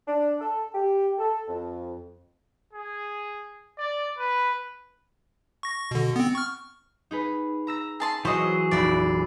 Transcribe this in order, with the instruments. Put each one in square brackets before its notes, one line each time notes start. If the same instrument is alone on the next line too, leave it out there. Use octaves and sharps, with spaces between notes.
[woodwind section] D4
A4
G4
A4
F2
[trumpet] G#4
D5
B4
[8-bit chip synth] C#6 A#6
B2 D3
B3 C4
C#6 F6
[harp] D#4 G#4 B4
A#5 E6 A#6
[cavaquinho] G#4 A5 C6
[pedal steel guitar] E3 F#3 G#4 [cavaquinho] C5 D#5 [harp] C#6 E6
[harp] F1 A#1 F#4 [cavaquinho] E4 D5